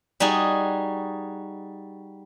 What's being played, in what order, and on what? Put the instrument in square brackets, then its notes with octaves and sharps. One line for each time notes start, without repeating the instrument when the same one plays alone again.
[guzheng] G3 D#4 F#4 G#4